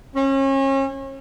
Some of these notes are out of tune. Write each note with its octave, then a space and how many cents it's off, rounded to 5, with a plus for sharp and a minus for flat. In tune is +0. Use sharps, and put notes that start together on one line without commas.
C#4 -35